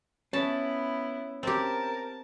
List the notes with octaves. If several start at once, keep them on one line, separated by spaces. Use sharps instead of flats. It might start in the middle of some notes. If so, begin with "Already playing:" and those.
B3 C#4 E4 A5
C4 G4 A#4 A5